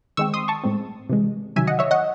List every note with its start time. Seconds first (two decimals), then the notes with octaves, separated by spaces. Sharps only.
0.17 D#3 G#3 C4 C#6 E6
0.34 C6 D#6
0.48 A5 C#6
0.63 A2 G#3 C4
1.09 C3 E3 G#3
1.56 C3 D#3 F#3 E5 G#5
1.67 D#5 F#5
1.79 C#5 E5
1.91 D#5 F#5